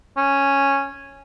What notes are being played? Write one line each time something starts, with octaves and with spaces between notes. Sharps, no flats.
C#4